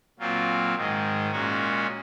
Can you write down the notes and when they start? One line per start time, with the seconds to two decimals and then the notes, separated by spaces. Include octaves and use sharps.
0.19 A#2 F#3 C4 F4
0.75 G#2 D#3 G#3
1.31 A#2 G#3 C#4 F#4